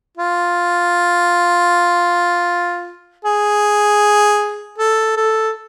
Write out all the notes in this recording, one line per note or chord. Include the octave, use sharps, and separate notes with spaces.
F4
G#4
A4
A4